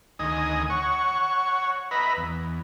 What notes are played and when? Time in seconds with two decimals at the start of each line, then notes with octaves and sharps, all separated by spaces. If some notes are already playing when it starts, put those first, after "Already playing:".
0.19 D2 D#3 D#5 G#5 D#6
0.70 C#5 F#5 C#6
1.91 B4 D#5 E5 A#5 B5
2.17 E2